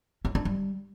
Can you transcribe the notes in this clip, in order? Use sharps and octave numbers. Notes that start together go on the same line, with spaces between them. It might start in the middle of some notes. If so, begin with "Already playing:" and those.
C#4
D4
G3